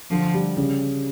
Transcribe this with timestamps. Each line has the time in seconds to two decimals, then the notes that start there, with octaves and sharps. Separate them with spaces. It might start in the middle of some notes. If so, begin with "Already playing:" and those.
0.11 D3 F3
0.34 G3
0.57 C#3